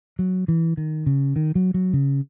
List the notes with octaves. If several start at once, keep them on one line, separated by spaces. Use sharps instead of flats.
F#3
E3
D#3
C#3
D#3
F#3
F#3
C#3